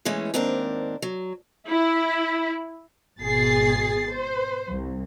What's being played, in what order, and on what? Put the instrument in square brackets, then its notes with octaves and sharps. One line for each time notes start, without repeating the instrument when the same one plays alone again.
[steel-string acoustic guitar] E3 G#3 A3 C#4
D#2 G#2 C4 D4 A#4
F#3
[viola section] E4
[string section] G#1 B2 G#4 A6 C7
C5
C2